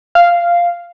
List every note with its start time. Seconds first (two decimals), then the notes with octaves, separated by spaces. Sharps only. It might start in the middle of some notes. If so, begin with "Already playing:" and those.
0.15 F5